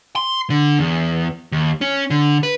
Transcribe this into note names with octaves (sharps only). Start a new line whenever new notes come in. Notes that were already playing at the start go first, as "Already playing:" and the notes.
C6
D3
E2
D#2
C#4
D3
B4